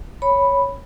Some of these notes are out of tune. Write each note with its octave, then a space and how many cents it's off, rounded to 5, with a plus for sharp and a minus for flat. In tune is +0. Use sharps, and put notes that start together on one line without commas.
C#5 +0 B5 +0